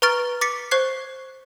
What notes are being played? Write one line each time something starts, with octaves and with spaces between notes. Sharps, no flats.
B4 A#5 C#6 F6 A6 D7
D6 A6 B6 C#7
C5 C#6 F#6 G#6 C7